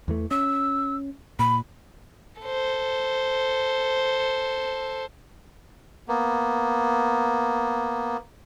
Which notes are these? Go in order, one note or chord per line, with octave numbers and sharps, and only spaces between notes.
E2 E3 A3
C#4 E6
A#2 B5
A4 C5
A#3 B3